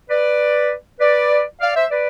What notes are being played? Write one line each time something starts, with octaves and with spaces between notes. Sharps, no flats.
B4 D5
B4 D5
D5 F5
C5 E5
B4 D5